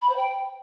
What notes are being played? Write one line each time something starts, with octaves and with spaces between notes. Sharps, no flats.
B5
C5
G5